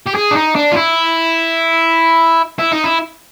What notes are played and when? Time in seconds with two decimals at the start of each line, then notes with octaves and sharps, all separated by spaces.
0.06 G4
0.15 G#4
0.31 D4
0.35 D#4
0.56 D4
0.72 F4
0.77 E4
2.59 E4
2.72 D#4
2.84 E4